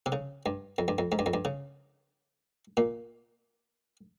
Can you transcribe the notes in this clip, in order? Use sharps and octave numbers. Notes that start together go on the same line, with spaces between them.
C3
C#3
G2
F2
G2
F2
G#2
G2
F2
G2
C#3
A#2